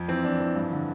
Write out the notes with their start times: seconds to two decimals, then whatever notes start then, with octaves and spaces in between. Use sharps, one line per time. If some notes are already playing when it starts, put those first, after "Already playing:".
Already playing: F2
0.08 E3 C4
0.25 F2 D4
0.40 E3
0.56 G2
0.72 D3